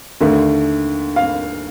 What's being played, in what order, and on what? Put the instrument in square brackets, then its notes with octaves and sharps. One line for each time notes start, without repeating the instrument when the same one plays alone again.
[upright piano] D#2 D3 A3
F5